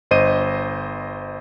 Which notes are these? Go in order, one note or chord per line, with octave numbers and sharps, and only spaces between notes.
G1 C5 D#5 D#7